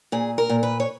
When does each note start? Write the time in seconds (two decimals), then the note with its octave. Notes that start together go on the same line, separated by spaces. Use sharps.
0.12 A#2 G#4
0.38 A#4
0.50 A#2
0.63 B4
0.80 C#5